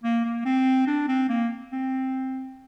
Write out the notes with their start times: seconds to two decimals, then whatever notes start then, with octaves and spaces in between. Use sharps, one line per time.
0.04 A#3
0.25 A#3
0.46 C4
0.87 D4
1.08 C4
1.29 A#3
1.72 C4